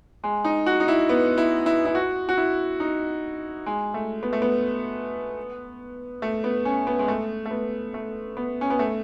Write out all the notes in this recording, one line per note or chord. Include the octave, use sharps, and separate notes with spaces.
G#3
D#4
F#4
D#4
E4
B3
E4
E4
E4
F#4
F#4
E4
D#4
G#3
A3
B3
A3
B3
A3
B3
C#4
B3
G#3
A3
A3
B3
A3
B3
C#4
B3
A3